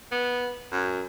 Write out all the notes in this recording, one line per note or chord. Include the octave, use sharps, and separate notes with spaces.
B3
F#2